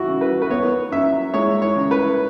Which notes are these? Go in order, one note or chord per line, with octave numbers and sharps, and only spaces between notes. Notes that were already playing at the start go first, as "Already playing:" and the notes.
Already playing: E3 F#4
C#3
B4
B4
B3 C#5
F#2 E5
G#3 C#5
C#5
C#3
B4